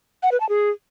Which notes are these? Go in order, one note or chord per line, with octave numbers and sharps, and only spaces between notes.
F#5
B4
A5
G#4